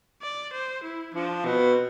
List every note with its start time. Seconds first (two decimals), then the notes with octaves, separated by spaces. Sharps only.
0.22 D5
0.53 C5
0.84 E4
1.15 F3 D4
1.45 B2 C4